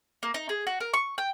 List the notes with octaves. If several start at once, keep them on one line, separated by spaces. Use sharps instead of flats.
A#3
D#4
G#4
F#4
A#4
C#6
G5